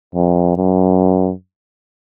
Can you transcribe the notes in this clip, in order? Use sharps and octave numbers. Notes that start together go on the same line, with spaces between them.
F2
F#2